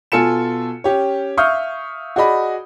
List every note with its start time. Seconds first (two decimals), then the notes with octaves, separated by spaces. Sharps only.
0.12 B2 F4 A4 G#5 C#7 E7
0.84 C#4 G4 C#5
1.37 E5 F5 C#6 D#6 F6 G6
2.16 F#4 G#4 D5 D#5 B5